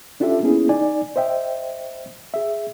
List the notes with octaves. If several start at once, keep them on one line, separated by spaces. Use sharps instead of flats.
C#4 D4 F4 G4 A4 E5
A#3 B3 C#4 E4 G#4
D#4 D5 G#5
C5 D#5 E5 G5
G#4 E5